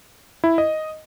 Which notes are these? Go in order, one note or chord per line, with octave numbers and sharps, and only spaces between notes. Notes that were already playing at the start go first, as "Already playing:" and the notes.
E4
D#5